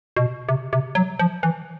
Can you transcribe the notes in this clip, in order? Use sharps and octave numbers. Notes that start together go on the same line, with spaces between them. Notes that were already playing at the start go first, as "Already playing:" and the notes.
B2
C3
C3
F#3
F3
E3